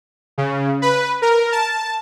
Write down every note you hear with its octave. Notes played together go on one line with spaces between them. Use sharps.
C#3
B4
A#4
A5